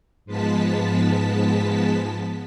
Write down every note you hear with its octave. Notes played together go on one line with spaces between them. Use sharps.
G#2 F3 G#3 B3 A5 B6